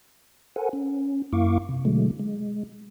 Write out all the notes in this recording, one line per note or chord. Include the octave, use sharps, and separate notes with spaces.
A4 A#4 C5 F#5 G#5
C#4
F#2 A#3 E4 F5 C#6 D6
C3
B2 D3 F#3 G#3 A3
G#3